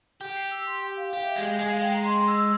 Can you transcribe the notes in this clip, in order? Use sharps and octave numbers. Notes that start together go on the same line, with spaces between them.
G4
C7
E6
C6
G5
F5
G4 F5
E5
G#3 F5
G#3 G#5
F5
G5
A#5
C6
C6
E6
E6